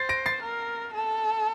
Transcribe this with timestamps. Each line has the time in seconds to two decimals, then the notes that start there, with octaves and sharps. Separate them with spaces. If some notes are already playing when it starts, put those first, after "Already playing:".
Already playing: C5 A6 C7
0.09 A#6 D7
0.26 A6 C7
0.43 A#4
0.93 A4